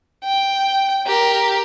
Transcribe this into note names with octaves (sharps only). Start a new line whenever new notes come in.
G5
G4 A#4